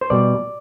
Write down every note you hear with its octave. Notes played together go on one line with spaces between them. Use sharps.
C5
B2 G3 D5